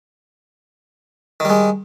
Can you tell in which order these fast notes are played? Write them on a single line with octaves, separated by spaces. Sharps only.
D#3 G3 G#3